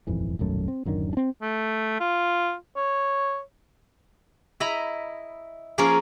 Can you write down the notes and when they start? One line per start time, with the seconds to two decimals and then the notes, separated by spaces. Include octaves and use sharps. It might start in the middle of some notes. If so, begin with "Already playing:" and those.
0.07 D#1 G#1 F2 E3
0.39 D#1 B1 F#2 A3
0.68 C4
0.85 D1 F#2 D3 D#3
1.13 C4 D4
1.42 A3
2.00 F4
2.76 C#5
4.60 E4 D#5 A#5 B5
5.78 F3 A#3 C#4 G#4 A#4